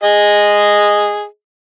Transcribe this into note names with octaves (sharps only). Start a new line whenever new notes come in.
G#4 D#5